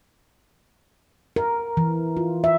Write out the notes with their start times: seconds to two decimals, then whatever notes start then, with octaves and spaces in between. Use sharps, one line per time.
1.36 A#4
1.77 E3
2.17 F4
2.44 E5